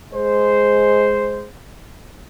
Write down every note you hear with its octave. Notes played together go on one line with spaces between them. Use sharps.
G#3 C5